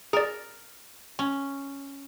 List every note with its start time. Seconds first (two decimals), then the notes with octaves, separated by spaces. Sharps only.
0.13 G#4 A#4 D5
1.19 C#4